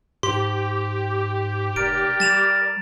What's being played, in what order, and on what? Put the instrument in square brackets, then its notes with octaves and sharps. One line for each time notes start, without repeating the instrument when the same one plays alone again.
[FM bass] G#2 [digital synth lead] G4 [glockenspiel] C6
[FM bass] F1 [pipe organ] A#4 D5 [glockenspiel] D7
[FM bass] G3 [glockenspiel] A6 E7 F7